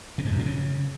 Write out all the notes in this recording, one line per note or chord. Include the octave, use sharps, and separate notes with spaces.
B2
G#2
F#2
A2
C#3